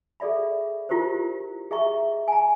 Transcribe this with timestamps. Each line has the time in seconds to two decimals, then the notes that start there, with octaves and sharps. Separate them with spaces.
0.20 G#4 A4 D5 E5 B5
0.89 E4 F4 G4 A#4 C5
1.71 G#4 D#5 E5 A#5 C#6
2.28 G#5 A#5